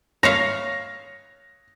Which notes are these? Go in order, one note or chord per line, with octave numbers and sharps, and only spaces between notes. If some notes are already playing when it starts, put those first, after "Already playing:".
C#5 E5 F5 A#6